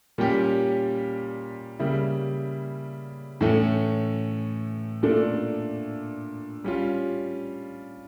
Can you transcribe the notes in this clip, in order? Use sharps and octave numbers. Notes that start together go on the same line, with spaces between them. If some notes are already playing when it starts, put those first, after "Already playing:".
A#2 G3 C#4 G4
C#3 G3 A#3 E4
A2 E3 A3 C#4
A#2 A3 D4 A4
G3 C#4 F4